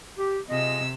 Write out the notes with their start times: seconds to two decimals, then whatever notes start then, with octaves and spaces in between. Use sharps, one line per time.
0.16 G4
0.49 C3 F4 G#4 D#5 E6